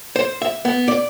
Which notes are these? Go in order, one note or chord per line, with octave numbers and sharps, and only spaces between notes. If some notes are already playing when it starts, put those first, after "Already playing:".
C5
E5
B3
D5